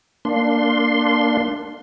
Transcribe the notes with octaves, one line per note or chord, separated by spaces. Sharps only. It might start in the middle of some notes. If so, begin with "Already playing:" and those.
A#3 D4 C6